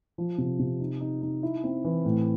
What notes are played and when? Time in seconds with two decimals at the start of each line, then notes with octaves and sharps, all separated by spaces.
0.18 F3
0.38 C3
0.59 C3
0.79 D#4
1.00 D#4
1.22 D#4
1.43 E4
1.64 C4
1.84 E3
2.05 A2